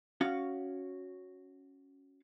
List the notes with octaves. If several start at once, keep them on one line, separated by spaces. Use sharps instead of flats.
C#4 F#4 F5